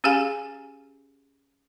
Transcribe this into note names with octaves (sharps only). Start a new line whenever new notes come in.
C#4 G4 G#4 F5 G#5